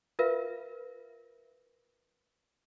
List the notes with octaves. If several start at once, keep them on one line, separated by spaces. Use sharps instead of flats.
F4 A#4 B4 E5 F5